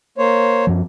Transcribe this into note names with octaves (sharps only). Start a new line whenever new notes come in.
A#3 C5 C#5
F#2 F3